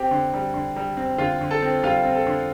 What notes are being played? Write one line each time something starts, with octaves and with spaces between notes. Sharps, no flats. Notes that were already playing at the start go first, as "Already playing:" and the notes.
Already playing: C4 G4
D3
G3
D3
G3
C4
D3 F4 F5
D3
A4 A5
C4
G3 F4 F5
C4
A4
D3